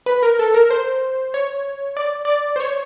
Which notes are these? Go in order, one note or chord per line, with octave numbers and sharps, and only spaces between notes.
B4
A#4
A4
A#4
C5
C#5
D5
D5
C5
C#5